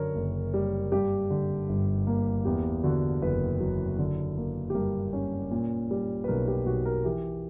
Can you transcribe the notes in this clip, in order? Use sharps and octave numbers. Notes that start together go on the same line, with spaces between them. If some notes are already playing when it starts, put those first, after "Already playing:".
Already playing: F#2 D3 A#4 C#5
F#1
G3
G2 G4
D3
G1
A#3
E2 G4
D3 F#4
F#1 B4
F#3
D3
A#3
G4
G2 A#4
C#4
A#2
G3
B4
B1 A#4
G4
B1 F#4
A#4
E3 G4